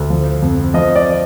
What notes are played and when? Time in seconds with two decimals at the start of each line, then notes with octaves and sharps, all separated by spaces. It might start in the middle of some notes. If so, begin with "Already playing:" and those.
Already playing: D2
0.10 F3
0.42 F2
0.74 F3 D#5
0.96 D5